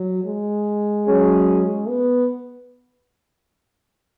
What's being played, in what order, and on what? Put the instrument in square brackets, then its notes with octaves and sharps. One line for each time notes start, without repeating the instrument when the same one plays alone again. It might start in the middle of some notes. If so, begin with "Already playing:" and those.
Already playing: [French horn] F#3
G#3
[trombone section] F#3 C#4 G#4
[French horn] B3